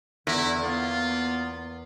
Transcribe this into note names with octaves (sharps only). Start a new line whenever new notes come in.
E2 D3 E4
A#3 B3 F4